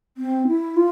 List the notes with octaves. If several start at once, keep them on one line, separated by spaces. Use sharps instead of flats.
C4
E4
F4